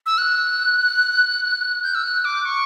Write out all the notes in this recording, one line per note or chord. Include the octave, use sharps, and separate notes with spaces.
E6
F#6
G6
E6
F#6
D6
C#6